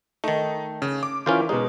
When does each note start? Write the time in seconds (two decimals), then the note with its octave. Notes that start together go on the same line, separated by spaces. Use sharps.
0.24 D#3 A3 D#4
0.82 C#3
1.03 D6
1.26 E3 C#4 E4 F4 A#4 C5
1.49 B2 G#3 D#4